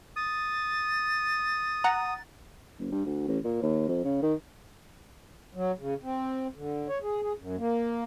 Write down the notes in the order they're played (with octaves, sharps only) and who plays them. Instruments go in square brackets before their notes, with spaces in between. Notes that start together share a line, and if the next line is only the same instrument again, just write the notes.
[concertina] D#6 [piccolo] A6
[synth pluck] F#5 A#5
[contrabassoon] F#1
G2
D2
A1
A#2
D#2
F2
C#3
D#3
[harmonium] F#3
C#3
C4
D3
C#5
G#4
G#4
F#2
A#3